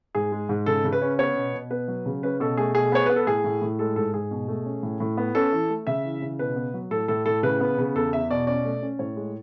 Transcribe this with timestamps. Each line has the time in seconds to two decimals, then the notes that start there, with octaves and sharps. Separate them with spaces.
0.15 G#2 G#4
0.32 G#3
0.49 G#2
0.66 C#3 A4
0.84 C#3
0.93 B4
1.02 C#4
1.19 B3 C#5
1.36 B2
1.54 B2
1.71 B3 B4
1.88 F#3
2.06 C#3
2.23 C#4 B4
2.40 B2 A4
2.57 A3 G#4
2.75 B2 G#4
2.92 B3 C#5
3.06 B3 B4
3.16 A4
3.27 A2 G#4
3.44 A2
3.62 A2
3.79 G#3 A4
3.96 G#2 A4
4.14 G#2 G#4
4.31 B2
4.48 A3
4.66 C#4
4.83 A2
5.00 A2
5.18 B3
5.35 C#4 A4
5.52 E3
5.70 A3
5.87 C#3 E5
6.05 E3
6.22 C#3
6.39 B2 B4
6.56 B3
6.74 F#3
6.91 A2 A4
7.08 A2 A4
7.26 A2 A4
7.43 C#3 B4
7.61 B3
7.78 C#3
7.95 E2 A4
8.13 E2 E5
8.30 B2 D5
8.47 C#4 D5
8.65 A3
8.83 C#4
8.99 A2 C#5
9.16 G#3